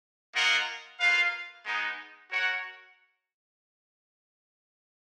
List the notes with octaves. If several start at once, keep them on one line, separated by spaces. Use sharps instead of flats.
A#3 F4 A#4 D#5 F#5
A#3 F4 B4 F5
G#3 B3 D#4
F#4 A#4 C#5 F#5